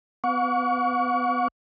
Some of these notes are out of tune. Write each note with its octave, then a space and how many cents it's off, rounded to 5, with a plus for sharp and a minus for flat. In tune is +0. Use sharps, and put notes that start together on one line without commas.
B3 +30 F#5 -40 C#6 +35